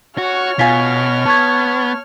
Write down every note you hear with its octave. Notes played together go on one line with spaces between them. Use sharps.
F#4 C#5 F6
B2 F4 G#5 B6
B3 A5 C#6 G#6